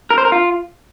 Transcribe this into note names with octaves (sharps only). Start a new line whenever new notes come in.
A#4
C5
A#4
F4